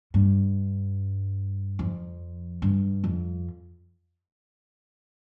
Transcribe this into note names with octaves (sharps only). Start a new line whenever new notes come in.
G2
F2
G2
F2